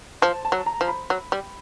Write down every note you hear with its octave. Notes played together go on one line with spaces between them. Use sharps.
F3 A5
A5
F#3
A#5
F3
B5
F#3
G3